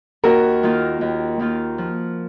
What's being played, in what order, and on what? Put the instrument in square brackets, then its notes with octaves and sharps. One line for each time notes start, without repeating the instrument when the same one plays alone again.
[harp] D#2 [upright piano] F#4 A#4
[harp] D#3 A#3 F4
D#2
D#3 A#3 F4
F3